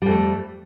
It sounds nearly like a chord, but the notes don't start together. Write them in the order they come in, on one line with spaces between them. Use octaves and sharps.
G3 F2 A3